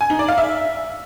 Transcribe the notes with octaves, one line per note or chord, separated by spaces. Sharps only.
G#5
D#4
D5
F5
E5